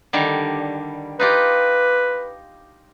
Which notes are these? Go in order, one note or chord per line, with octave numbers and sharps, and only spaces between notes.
D3 D#3 G3
D#4 F4 G4 B4